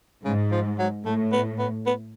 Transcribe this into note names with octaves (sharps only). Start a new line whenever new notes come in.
G#2 C#3
F3
F#3
A2 A3
B3
B3
B3